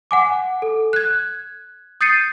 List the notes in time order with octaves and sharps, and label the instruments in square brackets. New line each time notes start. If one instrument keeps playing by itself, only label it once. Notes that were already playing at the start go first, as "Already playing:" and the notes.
[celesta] F#5 G#5 D6
A4
F#6 G#6
D#6 G6 A6 C7 C#7 D#7